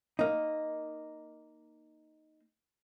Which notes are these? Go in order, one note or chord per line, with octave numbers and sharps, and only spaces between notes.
A#3 D#4